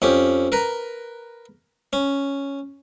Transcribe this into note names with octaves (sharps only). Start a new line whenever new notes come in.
F2 C#4 G4
A#4 B4 A#5
C#4